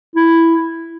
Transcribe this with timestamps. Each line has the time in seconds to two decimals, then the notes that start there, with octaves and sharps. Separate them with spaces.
0.16 E4